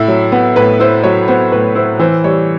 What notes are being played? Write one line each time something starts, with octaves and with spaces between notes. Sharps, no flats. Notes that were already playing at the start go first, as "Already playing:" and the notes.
Already playing: A2 E4
F#3
B3
A2 B4
E4 C5
F#3 C#5
B3 C5
A2 B4
E4 C5
E3 C5
G3 C#5